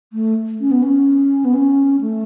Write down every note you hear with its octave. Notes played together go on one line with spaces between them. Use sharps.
A3
C#4
B3
C#4
B3
C#4
A3